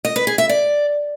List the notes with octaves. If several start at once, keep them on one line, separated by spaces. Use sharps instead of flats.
D#5
B4
G#4
E5
D5